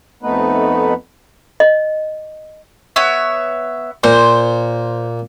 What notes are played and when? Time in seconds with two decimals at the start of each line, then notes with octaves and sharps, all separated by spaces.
0.23 F2 A3 B3 D#4 B4
1.60 D#5
2.96 B3 C#5 E5
4.04 A#2 C5